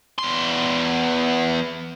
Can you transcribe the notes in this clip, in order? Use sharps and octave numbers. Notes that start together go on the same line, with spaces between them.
E2 C6